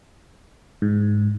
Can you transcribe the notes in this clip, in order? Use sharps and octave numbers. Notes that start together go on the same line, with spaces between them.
G#2